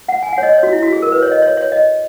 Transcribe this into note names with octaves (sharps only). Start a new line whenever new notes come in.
F#5
G#5
F#5
C#5
D#5
C#5
F#4
E4
F#4
G#4
A#4
B4
C#5
D#5
C#5
C#5
D#5